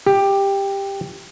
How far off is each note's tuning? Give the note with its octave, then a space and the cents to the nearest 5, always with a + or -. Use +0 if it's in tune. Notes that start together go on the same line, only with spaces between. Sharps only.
G4 +10